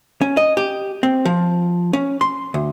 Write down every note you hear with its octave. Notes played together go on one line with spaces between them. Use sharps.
C#4
D#5
G4
C4
F3
C#4
C6
D2